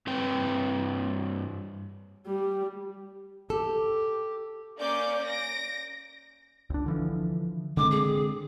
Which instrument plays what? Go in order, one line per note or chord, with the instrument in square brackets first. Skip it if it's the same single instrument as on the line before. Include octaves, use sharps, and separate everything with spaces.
[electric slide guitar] G2 C4 B4 G5
[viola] G3
[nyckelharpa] G4 [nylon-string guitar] A4
[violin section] A#3 C#4 D5 D6 G6
A#6 D7
[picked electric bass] C#2 D4
D3 E3 F3
[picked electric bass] D3 G#3 C4 [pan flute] D6
[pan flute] G#4